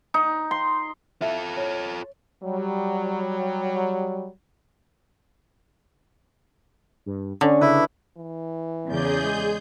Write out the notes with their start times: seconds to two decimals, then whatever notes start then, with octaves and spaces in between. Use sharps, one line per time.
0.14 D#4
0.51 C6
1.22 F4 A4 E5
1.57 C#5
2.42 F#3 G3
7.06 G2
7.41 D3 C#4 D4 C#6
7.61 C#3 E4 B4
8.17 E3
8.88 E2 C#3 G#4 D5 G6
9.24 G#3